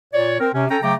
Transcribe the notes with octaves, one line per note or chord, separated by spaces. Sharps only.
A#2 C#5 D5
C4 A#4
C3 C#4
C#4 A4 G5 A#5
C#3 F#3 A3 G5 A#5 D6